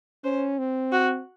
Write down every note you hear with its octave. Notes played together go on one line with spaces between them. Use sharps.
C#4 C5
C4
F#4